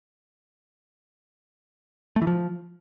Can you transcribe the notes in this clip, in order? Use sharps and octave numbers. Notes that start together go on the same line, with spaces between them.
A3
E3
F3